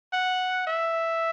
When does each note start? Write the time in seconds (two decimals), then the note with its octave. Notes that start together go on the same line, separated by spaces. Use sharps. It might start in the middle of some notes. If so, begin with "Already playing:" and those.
0.13 F#5
0.67 E5